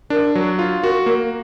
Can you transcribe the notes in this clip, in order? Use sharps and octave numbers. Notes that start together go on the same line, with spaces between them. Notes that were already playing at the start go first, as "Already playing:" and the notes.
D4 A#4
F#3
F4
F#4 A#4
A#3 A#4